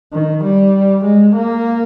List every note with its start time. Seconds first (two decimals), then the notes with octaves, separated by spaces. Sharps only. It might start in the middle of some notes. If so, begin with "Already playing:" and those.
0.13 D#3
0.43 G3
1.04 G#3
1.35 A#3